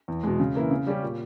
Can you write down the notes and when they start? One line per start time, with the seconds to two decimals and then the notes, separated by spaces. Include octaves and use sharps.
0.08 E2
0.24 B2 G#3
0.40 C#3
0.55 E3 A#3 E4
0.71 C#3
0.87 G3 C#4 G4
1.03 A#2